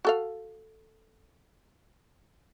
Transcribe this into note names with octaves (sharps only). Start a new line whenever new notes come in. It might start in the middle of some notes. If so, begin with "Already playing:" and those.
F#4 A4 F5